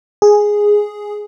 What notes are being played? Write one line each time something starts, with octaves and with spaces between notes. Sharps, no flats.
G#4